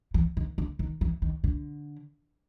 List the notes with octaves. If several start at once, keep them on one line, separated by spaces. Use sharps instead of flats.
E3
D#3
D3
D#3
E3
D#3
D3